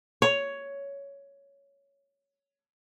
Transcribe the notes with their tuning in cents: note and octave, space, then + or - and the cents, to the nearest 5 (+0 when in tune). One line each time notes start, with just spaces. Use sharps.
C#5 +10